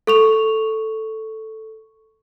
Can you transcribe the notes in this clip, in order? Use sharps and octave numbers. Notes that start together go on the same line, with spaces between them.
A4 C#6 F7